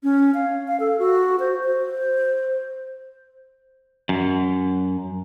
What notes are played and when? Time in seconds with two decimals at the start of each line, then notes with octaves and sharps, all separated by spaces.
0.03 C#4
0.34 F5
0.68 F5
0.80 A4
0.99 F#4
1.40 C5
1.63 C5
4.09 F#2